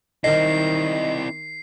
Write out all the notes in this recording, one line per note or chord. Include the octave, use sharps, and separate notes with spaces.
D#3 C4 E4 D#5 C7